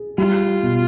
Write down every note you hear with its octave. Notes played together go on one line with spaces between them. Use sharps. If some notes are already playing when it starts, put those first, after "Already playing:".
Already playing: G#4
G3 F4
B2